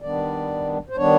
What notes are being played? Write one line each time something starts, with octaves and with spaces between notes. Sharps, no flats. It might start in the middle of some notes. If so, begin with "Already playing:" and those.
D#3 G3 B3 D4 D5
C5
D#3 G3 B3 D4 C#5